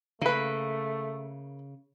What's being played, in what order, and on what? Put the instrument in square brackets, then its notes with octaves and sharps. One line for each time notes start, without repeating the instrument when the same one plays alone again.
[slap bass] C#3 [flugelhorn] A3 [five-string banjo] A#3 B4